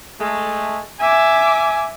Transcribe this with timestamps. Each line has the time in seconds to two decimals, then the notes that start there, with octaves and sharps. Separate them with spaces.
0.19 G#3 A3
1.00 E5 G#5 D6